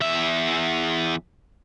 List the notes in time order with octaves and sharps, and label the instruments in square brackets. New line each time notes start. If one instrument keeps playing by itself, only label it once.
[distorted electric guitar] E2 E5